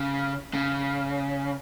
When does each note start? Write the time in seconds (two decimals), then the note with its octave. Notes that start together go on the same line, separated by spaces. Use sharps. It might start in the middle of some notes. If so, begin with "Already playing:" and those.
Already playing: C#3
0.54 C#3